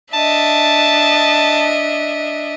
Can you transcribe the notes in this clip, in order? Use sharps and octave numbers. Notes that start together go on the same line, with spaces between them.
D4 D#5 E5 A5